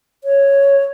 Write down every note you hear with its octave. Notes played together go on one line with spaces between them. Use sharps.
C#5